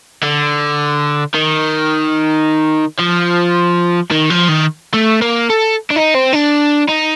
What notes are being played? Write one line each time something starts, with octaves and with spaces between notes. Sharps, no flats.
D3
D#3
F3
D#3
F3
D#3
A3
A#3
A4
D4
D#4
C4
D4
D#4